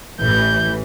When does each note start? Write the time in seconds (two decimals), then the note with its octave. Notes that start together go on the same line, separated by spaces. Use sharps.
0.21 A1 E3 G6